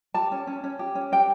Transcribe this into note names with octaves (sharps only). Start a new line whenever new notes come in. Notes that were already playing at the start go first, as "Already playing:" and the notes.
G4 A5
C#4
C#4
C#4
G4
C#4
G4 G5